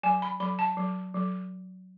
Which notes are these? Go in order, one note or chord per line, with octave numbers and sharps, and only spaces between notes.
F#3 G#5
B5
F#3 B5
A5
F#3
F#3